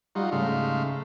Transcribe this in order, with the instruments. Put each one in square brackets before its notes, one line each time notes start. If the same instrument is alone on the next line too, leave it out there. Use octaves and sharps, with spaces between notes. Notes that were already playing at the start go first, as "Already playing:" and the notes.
[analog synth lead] G3 [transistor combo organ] D#4 F4 F#4
[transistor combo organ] G#2 A3 F5 [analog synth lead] C#3